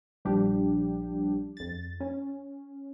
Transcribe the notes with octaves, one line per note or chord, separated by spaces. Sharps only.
A#1 F3 G3 D4 G4
F2 A6
C#4